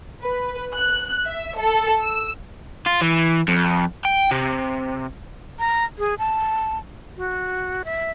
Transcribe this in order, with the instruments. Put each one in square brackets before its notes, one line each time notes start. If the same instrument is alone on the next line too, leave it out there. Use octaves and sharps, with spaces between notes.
[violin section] B4
F#6
E5
A4
E6
[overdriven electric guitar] F4
E3
F2
G5
C3
[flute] A#5
G#4
A5
F#4
E5